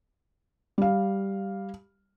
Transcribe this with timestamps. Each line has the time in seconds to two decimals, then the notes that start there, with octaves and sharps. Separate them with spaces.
0.78 G3 F5